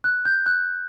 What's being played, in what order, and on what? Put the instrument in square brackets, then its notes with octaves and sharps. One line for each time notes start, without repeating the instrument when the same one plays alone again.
[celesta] F#6
G6
F#6